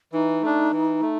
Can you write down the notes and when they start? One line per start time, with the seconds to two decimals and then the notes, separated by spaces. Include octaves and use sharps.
0.13 E3 D#4
0.42 A3 D4
0.71 E3
1.01 A3